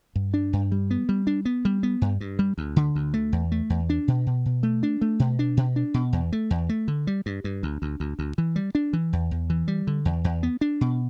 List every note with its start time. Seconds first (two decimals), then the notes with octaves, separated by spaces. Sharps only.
0.16 G2
0.34 D4
0.53 G2
0.72 G3
0.91 B3
1.09 G3
1.27 D4
1.45 B3
1.65 G3
1.83 B3
2.02 G2
2.21 G2
2.39 G3
2.58 D2
2.76 D3
2.95 D2
3.14 A3
3.32 E2
3.52 A3
3.70 E2
3.90 D4
4.08 B2
4.27 B2
4.46 B2
4.63 A3
4.83 D4
5.01 A3
5.19 B2
5.39 D4
5.57 B2
5.76 D4
5.94 B2
6.13 E2
6.33 A3
6.50 E2
6.69 A3
6.88 D3
7.07 G3
7.26 G2
7.44 G2
7.63 D2
7.82 D2
8.00 D2
8.19 D2
8.38 E3
8.56 G3
8.75 D4
8.93 E3
9.13 E2
9.31 E2
9.50 E3
9.68 G3
9.87 D3
10.05 E2
10.24 E2
10.43 B3
10.61 D4
10.81 B2